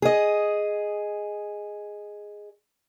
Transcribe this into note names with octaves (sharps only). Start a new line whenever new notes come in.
G#4 D#5